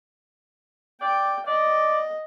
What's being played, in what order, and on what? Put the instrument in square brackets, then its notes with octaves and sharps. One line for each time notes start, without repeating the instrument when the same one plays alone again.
[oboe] D5 [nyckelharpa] G5
[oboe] D5 [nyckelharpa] D#5